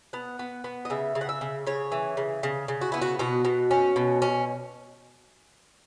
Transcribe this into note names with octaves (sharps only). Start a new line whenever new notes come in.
B3 F#5
B3
B3
D#5
C#3 E5
C#3
F#5
E5
C#3
C#3 C#5
E3
C#3
C#3
C#3
F#4
B3 E4
F#4
B2 F#4
B2
C#4
B2
C#4